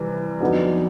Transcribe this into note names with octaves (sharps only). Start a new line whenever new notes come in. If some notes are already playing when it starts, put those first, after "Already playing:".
Already playing: C3 E3 G3
F2 D3 F#3 B3 D#4